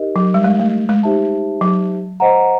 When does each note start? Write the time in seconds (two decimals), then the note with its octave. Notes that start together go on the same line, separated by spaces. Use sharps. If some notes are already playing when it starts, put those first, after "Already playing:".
Already playing: D#4 G4 A#4 D#5
0.16 F#3
0.34 G3
0.44 G#3
0.60 A3
0.89 G#3
1.03 D#4 G4 C5 E5 A5
1.61 F#3
2.20 C5 D#5 F#5 A#5